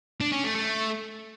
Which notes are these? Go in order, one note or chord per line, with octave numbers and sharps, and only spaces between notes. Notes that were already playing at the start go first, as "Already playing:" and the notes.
D4
C#4
A3
A3